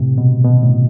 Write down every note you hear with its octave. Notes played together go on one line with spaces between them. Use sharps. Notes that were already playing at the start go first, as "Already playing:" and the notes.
Already playing: A2 C3
B2
B2
A2